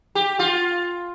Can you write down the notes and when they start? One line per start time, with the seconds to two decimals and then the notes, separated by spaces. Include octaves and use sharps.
0.15 G4
0.39 F4